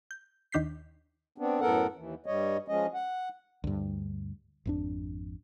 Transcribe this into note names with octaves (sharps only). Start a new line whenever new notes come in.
G6
D#2 D#3 D4 G6 B6 C7
B3 C4 D4
F#2 A2 B3 A4 A#4 F#5
D#2 E3
G2 G3 C#5 D#5
F3 G#3 C#4 D#5
F#5
D2 G2
G#1 F2 D4